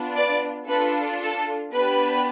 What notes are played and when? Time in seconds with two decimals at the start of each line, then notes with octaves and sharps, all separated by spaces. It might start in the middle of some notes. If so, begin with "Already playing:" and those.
Already playing: B3 D4 F4
0.15 B4 D5
0.67 D4 F4 A4 B4
1.20 A4
1.71 B3 D4 G4 B4